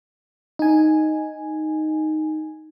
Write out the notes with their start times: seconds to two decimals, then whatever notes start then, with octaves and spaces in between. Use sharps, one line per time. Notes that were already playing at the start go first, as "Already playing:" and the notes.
0.59 D#4 G#5